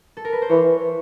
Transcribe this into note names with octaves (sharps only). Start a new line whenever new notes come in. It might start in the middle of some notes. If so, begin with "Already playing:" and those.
A4
A#4
B4
C5
E3 C#5